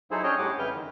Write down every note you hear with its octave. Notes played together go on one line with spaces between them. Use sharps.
F#3 D#4 E4 G#4 A4 C5
C#4 D4 G#4 C#5 D#5 G5
A2 G3 F#5 D6
F2 C#3 E4 B4 F6 G6
D#3